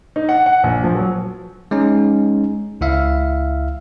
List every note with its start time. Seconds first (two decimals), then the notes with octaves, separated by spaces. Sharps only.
0.16 D#4
0.29 F#5
0.46 F#5
0.63 A#1
0.84 F3
0.95 F#3
1.71 G#3 C#4 D#4
2.81 C#2 E4 E5 F5